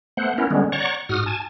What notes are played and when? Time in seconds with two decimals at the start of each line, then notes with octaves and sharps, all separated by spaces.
0.17 A3 B3 C5 F#5
0.38 B3 C#4 E4 A#4
0.50 D3 G3 G#3 B3 C#4
0.72 C#5 D5 F#5 A#5 C#6
1.09 G#2 F#4 D#6 F6
1.26 G#5 A5